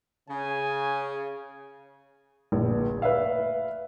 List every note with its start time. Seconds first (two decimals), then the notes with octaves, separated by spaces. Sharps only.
0.28 C#3 G#5
2.52 D1 A#1
3.02 B4 D5 E5 F5